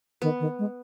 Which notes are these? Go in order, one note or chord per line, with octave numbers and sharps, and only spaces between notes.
D#3 B3
D#3
G#3